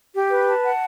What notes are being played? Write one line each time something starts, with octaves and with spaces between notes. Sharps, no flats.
G4
B4
A5
F#5